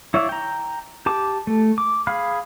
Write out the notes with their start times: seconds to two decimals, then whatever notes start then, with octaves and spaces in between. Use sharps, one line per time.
0.14 E4 C#5 D5 E5 F5
0.29 G5 A#5
1.06 G4 A5 D6
1.47 A3
1.78 D6
2.07 G#4 F5 B5 F6